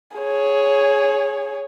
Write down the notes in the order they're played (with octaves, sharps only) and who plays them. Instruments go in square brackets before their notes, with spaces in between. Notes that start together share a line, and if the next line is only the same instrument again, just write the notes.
[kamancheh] G#4 C#5